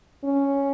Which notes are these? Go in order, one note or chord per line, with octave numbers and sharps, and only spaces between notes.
C#4